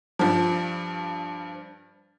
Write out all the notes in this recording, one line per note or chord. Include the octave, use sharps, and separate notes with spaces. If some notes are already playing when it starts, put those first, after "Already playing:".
G2 F3